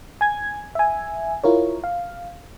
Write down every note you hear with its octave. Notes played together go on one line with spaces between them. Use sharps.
G#5 G#6
E5 G#5
E4 F4 A#4 C#5
F5